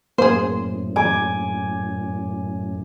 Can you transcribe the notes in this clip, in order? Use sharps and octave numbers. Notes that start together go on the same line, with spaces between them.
F#2 A2 A#3 G#4 C5
G#5 D6